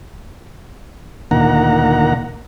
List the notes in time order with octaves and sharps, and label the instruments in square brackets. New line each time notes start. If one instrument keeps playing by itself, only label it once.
[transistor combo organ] D2 A#2 D#3 A#3 F#5 A#5